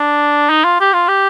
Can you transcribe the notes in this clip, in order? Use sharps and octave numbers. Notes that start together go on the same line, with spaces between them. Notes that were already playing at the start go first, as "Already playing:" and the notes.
Already playing: D4
D#4
F4
G4
F4
G4